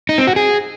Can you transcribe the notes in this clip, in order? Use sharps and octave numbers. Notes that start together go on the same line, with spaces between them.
D#4
C4
F#4
G#4